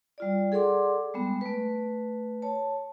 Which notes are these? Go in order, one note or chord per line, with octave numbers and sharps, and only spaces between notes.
G3 F4 D5
G#4 A4 D5 F#5 C6 D6
G3 G#3 B3
A3 B4
C#5 A5